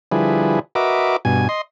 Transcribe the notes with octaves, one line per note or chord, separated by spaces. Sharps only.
D3 F3 G3 E4 G#4 B4
F#4 A#4 B4 D#5 E5 D6
G2 B2 G#5
D#5 C6